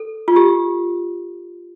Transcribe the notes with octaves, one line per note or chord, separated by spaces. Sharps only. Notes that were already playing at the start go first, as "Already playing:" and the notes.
Already playing: A4
F4
G4